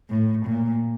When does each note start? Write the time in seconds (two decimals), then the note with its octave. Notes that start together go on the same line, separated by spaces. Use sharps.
0.10 A2
0.46 A#2